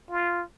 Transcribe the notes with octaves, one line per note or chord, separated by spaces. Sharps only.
F4